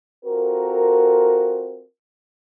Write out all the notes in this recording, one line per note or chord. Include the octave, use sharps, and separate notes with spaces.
C4 F4 F#4 A4 A#4